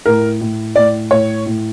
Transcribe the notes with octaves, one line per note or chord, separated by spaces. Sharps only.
A2 A#4
A2
A2 D5
A2 C#5
A2